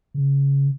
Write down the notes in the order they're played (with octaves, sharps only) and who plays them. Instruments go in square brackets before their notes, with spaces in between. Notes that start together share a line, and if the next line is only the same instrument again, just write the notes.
[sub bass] C#3